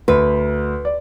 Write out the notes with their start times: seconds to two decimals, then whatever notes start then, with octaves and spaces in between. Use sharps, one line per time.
0.08 D2 B4
0.85 D5